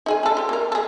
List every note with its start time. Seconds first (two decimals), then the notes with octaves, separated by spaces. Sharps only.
0.06 D#4 G#4 G#5
0.23 D4 A4
0.37 F4 G4
0.49 A#3 A#4
0.72 G#4 A4